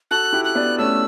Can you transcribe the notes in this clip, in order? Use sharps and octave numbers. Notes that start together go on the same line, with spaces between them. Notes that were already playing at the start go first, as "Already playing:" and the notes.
F#4 A4 F#6
E4 G4
F#6
B3 D4
A3 C#4 E6